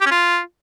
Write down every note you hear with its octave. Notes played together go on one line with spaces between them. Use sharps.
G4
C#4
F4